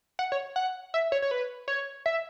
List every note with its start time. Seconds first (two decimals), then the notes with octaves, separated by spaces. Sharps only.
0.19 F#5
0.32 C#5
0.56 F#5
0.94 E5
1.12 C#5
1.22 C#5
1.31 B4
1.68 C#5
2.06 E5